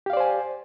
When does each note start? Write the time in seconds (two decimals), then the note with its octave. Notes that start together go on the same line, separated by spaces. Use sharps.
0.06 G4
0.10 F5
0.13 D5
0.17 C5
0.20 G#5